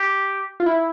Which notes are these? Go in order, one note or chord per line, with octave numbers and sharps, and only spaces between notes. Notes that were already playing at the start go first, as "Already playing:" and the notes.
Already playing: G4
F4
E4